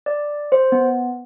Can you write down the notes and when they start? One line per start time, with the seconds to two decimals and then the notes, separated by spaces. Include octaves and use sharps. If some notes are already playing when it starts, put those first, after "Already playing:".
0.06 D5
0.52 C5
0.72 B3